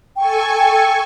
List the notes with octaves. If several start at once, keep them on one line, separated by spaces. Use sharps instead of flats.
A4 G5 G#5 C#6